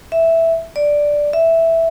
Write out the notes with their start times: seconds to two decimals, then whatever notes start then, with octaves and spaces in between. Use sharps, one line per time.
0.12 E5
0.76 D5
1.33 E5